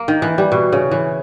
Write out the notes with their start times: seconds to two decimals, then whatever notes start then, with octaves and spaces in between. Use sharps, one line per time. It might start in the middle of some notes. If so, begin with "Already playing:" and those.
Already playing: A#3
0.08 D#3
0.22 E3
0.38 G3
0.52 B2
0.72 C#3
0.91 E3